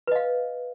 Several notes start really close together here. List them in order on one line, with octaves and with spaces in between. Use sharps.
B4 D#5 F5